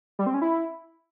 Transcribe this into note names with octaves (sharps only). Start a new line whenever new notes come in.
G3
C4
C#4
E4